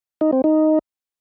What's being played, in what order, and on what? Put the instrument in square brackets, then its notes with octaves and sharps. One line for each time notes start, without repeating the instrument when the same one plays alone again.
[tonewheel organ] D#4
C4
D#4